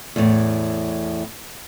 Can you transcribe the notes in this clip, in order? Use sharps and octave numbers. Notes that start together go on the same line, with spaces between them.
E2 A2